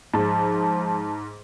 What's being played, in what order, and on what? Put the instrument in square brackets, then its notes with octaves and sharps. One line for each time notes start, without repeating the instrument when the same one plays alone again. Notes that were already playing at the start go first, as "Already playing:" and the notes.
[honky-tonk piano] G#2 [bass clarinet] F3 [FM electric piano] A5